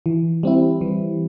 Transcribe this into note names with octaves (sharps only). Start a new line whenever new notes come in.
E3
G3 C4 E4
E3